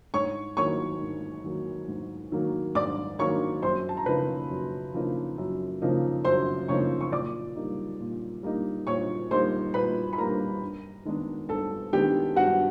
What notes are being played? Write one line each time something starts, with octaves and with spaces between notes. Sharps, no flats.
G#2 C#5 C#6
D#3 F#3 A#3 C#5 C#6
G#2
D#3 F#3 A#3
G#2
D#3 F#3 A#3
G#2 D5 D6
D#3 F#3 A#3 C#5 C#6
F#2 C5 C6
A5
A#5
C#3 F3 A#3 D#4 B4 B5
F#2
C#3 F3 A#3 D#4
F#2
C#3 F3 A#3 D#4
F#2 C5 C6
C#3 F3 A#3 D#4 C#5 C#6
C#6
A#2 D5 D6
G3 A#3 D#4
A#2
G3 A#3 D#4
A#2 C#5 C#6
G3 A#3 D#4 C5 C6
A#2 B4 B5
B5
G3 A#3 D#4 A#4 A#5
G2
D#3 G#3 B3 D4
G2 A4 A5
D#3 G#3 B3 D4 G4 G5
G2 F#4 F#5